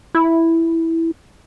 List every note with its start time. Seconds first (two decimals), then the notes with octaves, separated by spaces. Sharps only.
0.15 E4